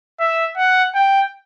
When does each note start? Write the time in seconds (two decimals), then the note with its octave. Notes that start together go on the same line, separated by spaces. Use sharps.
0.20 E5
0.57 F#5
0.95 G5